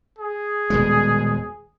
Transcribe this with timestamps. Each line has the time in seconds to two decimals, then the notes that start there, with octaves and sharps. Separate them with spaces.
0.18 G#4
0.70 D#1 B2 G#3